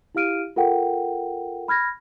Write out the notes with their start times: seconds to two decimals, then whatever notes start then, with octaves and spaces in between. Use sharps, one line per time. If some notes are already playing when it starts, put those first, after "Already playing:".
0.15 E4 G4 F5 F6 D7 D#7
0.56 F4 A4 A#4 F#5 G5
1.68 B5 F6 G#6 A#6